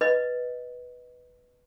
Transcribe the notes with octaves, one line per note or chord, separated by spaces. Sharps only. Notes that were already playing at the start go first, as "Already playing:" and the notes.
B4 D#5